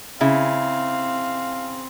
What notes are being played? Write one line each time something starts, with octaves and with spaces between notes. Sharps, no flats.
C#3 C4 E4 F5